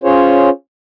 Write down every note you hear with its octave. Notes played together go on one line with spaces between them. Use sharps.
C#4 F4 G#4 C5 C#5